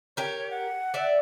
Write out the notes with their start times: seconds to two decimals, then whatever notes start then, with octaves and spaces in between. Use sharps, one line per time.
0.17 G4 A#4 C#5
0.51 F#5
0.94 D5 E5